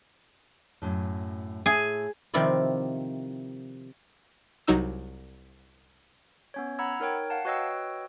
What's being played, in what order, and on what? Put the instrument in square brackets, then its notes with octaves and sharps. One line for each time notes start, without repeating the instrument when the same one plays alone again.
[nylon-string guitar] F#2 A2
[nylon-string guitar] A2 E5 [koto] G#4 G#5
[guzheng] C3 D#3 F3 E4 D5 D#5
[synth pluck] C2 F#3 D#4 E6
[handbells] B3 C#4 C#5
F#5 A#5 B5 E6 G#6
D#4 A#4 C#5 G5
F5 F#5 A5
F#4 B4 C#5 D#5 G5 E6